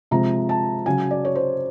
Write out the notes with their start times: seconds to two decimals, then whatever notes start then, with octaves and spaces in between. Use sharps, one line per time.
0.11 C3 F3 G#3 A#5
0.49 A5
0.86 C#3 F#3 G#5
1.11 D5
1.25 C#5
1.35 C5